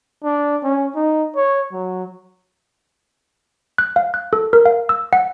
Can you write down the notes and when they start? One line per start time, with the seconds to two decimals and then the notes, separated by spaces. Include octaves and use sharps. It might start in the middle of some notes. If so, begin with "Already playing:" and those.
0.24 D4
0.64 C#4
0.95 D#4
1.36 C#5
1.72 F#3
3.78 F#6
3.96 F5
4.14 F#6
4.33 A4
4.53 A#4
4.66 F5
4.89 E6
5.13 F#5